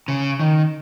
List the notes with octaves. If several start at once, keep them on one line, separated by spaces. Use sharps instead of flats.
C#3
D#3